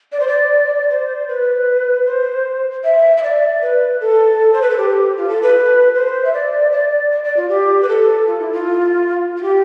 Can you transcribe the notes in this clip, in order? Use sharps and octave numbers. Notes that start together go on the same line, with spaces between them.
D5
C5
D5
C5
B4
C5
E5
E5
D5
B4
A4
C5
B4
A4
G4
F4
A4
B4
C5
E5
D5
D5
D5
D5
F4
G4
B4
A4
F4
E4
F4
F4
G4